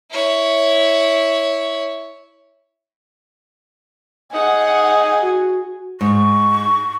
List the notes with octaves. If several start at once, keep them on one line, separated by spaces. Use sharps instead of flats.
E4 C#5
D#4 G#4 F#5
F#4
G#2 C#6